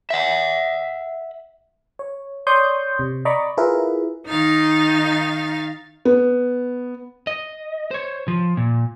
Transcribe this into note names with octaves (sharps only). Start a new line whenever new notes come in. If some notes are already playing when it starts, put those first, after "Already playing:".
E5 F#5
C#5
C#5 D5 C6 C#6 D#6 G6
C3
D5 D#5 A#5 B5 C#6 D6
E4 F4 G#4 A#4 B4 E5
D#3 D#4 F5 A6
B3
D#5
C5 C#5
F3
A#2